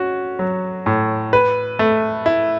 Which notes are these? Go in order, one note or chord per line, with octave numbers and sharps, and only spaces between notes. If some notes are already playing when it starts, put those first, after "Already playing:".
Already playing: C#4 F#4
F#3
A2
B4
A3
E4